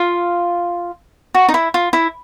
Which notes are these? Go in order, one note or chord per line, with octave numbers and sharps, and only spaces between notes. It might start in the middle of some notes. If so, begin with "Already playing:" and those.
Already playing: F4
F#4
D#4
E4
F4
E4